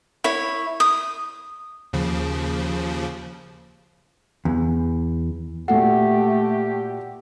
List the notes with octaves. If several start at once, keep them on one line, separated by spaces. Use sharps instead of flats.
E4 C#5
D#6
D#2 C#3 F3
E2
A#2 A3 F#4 G4 A4 F#5